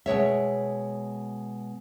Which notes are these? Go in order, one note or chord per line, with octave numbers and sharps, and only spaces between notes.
B2 G#3 C#5 E5